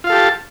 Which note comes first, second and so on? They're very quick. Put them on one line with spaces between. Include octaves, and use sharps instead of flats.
F4 F5 A4 G4 A5